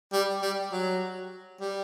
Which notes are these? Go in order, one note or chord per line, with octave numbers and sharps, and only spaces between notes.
G3
G3
F#3
G3